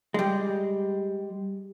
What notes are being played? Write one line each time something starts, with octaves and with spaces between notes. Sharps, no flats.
G3 G#3